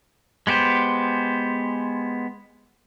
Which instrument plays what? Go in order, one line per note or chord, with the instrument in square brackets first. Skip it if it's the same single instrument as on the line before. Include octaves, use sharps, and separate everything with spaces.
[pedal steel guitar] G#3 B3 G4 C5